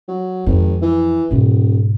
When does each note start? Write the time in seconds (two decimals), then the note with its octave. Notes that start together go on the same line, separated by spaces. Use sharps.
0.08 F#3
0.46 G#1 F2
0.82 E3
1.31 D#1 G#2 B2